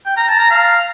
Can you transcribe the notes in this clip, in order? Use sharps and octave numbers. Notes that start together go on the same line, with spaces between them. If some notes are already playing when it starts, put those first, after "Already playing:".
G5
A#5
A5
A#5
F5